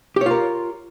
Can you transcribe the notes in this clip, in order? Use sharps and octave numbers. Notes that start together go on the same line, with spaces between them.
F4 G4 A#4 C#5